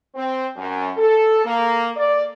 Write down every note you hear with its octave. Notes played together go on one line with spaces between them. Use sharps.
C4
F#2
A4
A#3
D5